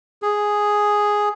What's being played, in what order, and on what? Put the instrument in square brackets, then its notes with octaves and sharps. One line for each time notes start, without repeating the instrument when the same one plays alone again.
[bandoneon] G#4